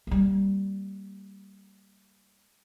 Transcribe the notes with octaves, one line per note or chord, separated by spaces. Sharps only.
G3 A#3